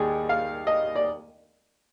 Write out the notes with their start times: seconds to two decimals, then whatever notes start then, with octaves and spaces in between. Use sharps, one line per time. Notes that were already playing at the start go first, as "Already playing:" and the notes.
Already playing: D#2 G3 G#4
0.29 F5
0.67 D#5
0.96 D5